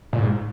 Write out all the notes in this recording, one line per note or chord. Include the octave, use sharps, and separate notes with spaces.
A#2
G#2